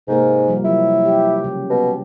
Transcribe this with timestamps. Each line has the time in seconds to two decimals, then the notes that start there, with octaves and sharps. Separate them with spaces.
0.08 G#2 C3 A#3 A#4
0.48 F3 G3
0.65 F#3 E4
1.05 G4
1.44 C#3
1.70 B2